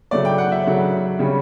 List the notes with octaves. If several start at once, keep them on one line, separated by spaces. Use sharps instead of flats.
C#3 F#3 A3 D5
G5
F#5
E5
C#3 F#3 A3
C#3 G3 C#4